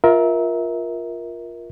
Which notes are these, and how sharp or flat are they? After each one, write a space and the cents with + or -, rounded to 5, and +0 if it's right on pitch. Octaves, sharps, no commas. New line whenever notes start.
F4 +5 A#4 +15 E5 -30